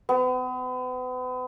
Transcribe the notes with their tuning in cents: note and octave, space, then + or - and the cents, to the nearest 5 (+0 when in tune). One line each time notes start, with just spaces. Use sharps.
B3 +40